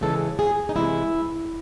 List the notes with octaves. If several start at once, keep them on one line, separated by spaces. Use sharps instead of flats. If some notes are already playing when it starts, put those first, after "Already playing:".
C#3 E3 G#3 A4
G#4
D#4
C3 E3 G#3 E4